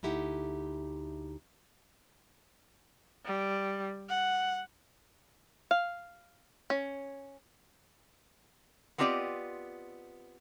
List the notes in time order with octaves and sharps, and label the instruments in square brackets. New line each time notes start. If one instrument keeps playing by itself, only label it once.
[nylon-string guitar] D2 D#4 E4 G4 F#5
[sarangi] G3
F#5
[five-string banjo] F5
C#4
[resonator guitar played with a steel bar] B3 C4 F4 G4 D5 D#5